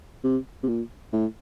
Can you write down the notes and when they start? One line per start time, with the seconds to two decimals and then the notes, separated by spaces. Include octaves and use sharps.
0.24 C3
0.63 C3
0.68 A#2
1.12 A2